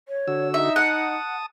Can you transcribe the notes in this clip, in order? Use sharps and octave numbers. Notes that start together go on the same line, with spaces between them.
C#5
D3 F#4 E6
D#4 E5
F#5 A5 D#6